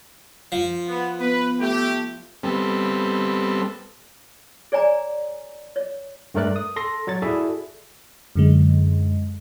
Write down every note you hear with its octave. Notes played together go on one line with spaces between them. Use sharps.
F3
B3
B3 B4
A3 G4
G3 B3 C4 A4
G#4 C#5 D5 G#5 A#5
C#5
G2 A3 A#4 D5 F#6
D#6
A4 C6 A#6
F#3 C#5 A6
E4 F#4 G#4 A4 D5 E5
F#2 D3 G#3